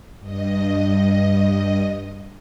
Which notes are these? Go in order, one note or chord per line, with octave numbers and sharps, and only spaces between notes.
G2 D#5